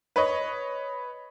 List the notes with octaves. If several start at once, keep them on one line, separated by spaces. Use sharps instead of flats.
B4 C#5 D#5